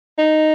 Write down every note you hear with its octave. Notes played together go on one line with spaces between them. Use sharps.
D#4